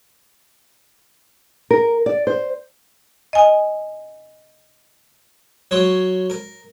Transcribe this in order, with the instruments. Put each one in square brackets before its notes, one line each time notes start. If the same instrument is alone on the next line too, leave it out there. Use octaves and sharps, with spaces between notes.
[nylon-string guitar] A#4
D5
C5
[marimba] D#5 G#5
[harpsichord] F#3 C#5 C6
A#4